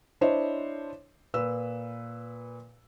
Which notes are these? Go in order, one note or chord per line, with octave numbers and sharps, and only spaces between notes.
D4 E4 C5 C#5 D#5 E5
A#2 B4 E6